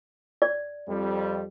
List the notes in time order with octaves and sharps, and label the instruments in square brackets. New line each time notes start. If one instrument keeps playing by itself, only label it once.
[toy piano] D5
[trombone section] F2 G3